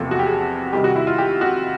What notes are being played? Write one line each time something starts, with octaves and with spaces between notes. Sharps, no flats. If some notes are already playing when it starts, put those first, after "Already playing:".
Already playing: E2 C3 F3 A#3 A4
F#4
G4
G#4
C3 D#3 G3 G4
F#4
E4
F4
G4
F#4